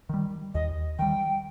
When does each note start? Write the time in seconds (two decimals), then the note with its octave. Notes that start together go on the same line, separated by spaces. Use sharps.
0.09 D#3 G3
0.54 D#2 D#5
0.98 D#3 G3 G5